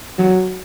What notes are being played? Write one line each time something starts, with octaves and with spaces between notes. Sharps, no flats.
F#3